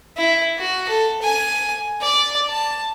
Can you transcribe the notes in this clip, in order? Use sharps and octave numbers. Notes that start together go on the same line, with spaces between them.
E4
F#4
A4
G#5
D5
A5